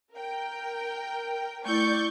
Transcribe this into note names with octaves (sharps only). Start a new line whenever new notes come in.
A#4 G5
A3 E4 D5 C#6 G6